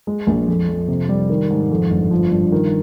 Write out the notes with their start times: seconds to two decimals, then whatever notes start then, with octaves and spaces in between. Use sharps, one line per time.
0.07 G#3
0.27 A#1
0.48 F2
0.69 F2
0.88 C3
1.09 G3
1.30 D#3
1.50 G#2
1.71 F2
1.90 G1
2.11 F3
2.31 G2
2.52 D#3